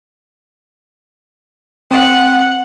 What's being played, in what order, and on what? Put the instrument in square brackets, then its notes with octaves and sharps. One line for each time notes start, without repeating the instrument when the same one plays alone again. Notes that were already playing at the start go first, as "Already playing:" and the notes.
[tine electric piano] C4 [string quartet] F#5